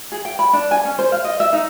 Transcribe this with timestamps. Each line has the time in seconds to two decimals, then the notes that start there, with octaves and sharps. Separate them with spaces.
0.12 G#4
0.25 G5
0.39 B5
0.53 D4
0.71 G#5
0.85 C#4
0.99 C5
1.12 F5
1.24 D#5
1.40 E5
1.53 D#4